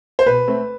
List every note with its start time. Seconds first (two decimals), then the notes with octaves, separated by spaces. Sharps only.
0.19 C5
0.26 B2 B4
0.48 A3 C4